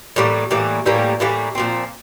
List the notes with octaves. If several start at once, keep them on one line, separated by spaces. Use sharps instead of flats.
A2 E3 G3 A#3
A2 E3 G3 A#3
A2 E3 G3 A#3
A2 E3 G3 A#3
A#2 F3 C4